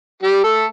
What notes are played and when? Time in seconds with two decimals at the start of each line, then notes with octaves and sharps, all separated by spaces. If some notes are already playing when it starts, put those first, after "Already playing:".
0.22 G3 G4
0.44 A3 A4